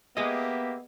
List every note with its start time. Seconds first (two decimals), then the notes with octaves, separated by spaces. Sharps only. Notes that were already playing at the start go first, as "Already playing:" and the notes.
0.17 A#3 B3 G4 G#4 D#5 E5